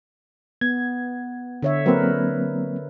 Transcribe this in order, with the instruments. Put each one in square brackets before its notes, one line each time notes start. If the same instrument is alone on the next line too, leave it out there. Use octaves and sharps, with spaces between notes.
[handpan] B3 [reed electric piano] G#6
[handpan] D3 C#5 E5
[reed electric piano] F#3 A#3 C4 [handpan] A#4 B4